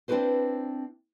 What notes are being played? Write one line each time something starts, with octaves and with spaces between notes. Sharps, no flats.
C4 D4 E4 G4 B4 C5